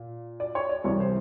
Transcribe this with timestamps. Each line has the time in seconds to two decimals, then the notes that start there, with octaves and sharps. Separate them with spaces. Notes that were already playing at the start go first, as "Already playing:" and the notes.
Already playing: A#2
0.40 D5
0.55 C#5
0.69 D5
0.84 C2 C3 E3 C#5
1.00 C5